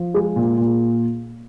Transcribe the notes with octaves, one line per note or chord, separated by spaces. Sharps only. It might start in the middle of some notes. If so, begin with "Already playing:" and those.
Already playing: F3
G#3
A#2
A#2